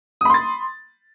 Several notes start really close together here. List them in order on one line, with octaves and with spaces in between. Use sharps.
D#6 B5 C6 A6